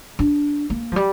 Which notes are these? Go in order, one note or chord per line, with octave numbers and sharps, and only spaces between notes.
D4
A#3
F3
G3